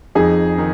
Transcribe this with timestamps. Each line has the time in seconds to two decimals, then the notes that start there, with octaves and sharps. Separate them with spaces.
0.15 F2 D#4 G#4
0.58 D#3